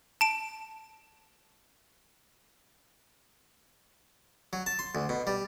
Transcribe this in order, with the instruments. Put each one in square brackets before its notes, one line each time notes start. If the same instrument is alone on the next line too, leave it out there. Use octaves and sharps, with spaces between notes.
[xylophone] A5 D7
[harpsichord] F#3
A5
C6
D2
B2
G3